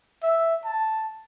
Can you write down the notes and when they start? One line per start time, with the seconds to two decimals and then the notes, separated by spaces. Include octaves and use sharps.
0.23 E5
0.65 A5